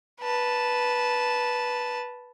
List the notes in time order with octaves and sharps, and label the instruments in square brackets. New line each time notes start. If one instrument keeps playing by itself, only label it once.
[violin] B4 A5